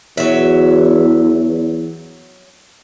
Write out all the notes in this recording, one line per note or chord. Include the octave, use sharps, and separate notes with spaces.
E2 F#3 E5